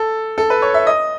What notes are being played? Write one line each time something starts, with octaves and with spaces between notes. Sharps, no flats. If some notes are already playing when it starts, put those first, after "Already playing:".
Already playing: A4
A4
B4
C#5
E5
D#5